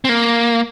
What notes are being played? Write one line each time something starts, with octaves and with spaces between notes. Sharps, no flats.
C4
A#3